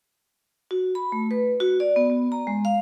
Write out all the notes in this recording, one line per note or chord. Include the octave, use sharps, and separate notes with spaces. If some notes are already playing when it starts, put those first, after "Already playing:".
F#4
B5
A3
B4
F#4
D5
B3
B3
A#5
G#3
F5